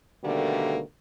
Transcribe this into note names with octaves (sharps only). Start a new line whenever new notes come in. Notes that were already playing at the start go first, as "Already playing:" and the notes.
B2 D3 D#3 G3 A3 A#3